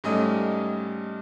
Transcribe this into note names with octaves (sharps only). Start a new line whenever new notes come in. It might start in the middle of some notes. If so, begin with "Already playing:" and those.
G#2 G3 A3 C#4 D#5 D#6